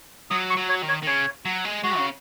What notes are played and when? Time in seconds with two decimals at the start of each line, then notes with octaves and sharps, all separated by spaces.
0.31 F#3 D#6
0.50 C#6
0.57 F#3
0.69 C#5
0.82 D#3
0.88 C#5
1.02 D#3
1.07 C#3 C#5
1.45 F#3
1.65 G#3
1.83 G#3 F#4
1.98 C#3